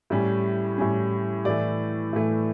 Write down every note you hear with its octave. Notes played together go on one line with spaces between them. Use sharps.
A2 G3 C#4
A2 G3 C#4
A2 E3 A3 D5
A2 E3 A3